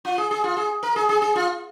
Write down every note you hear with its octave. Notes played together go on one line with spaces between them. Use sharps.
F4
G#4
G#4
F4
G#4
A#4
G#4
G#4
G#4
F4